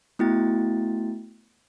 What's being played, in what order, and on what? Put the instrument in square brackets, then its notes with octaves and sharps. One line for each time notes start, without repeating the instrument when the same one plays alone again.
[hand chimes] A3 B3 E4 F#4 G5 A6